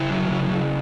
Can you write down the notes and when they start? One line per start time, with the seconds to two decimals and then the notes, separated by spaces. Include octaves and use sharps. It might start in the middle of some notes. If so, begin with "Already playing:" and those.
Already playing: C#3 E4
0.10 F#3
0.29 C#3
0.50 C#3